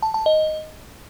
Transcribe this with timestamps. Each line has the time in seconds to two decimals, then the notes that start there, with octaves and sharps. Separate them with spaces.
0.02 A5
0.14 A5
0.26 D#5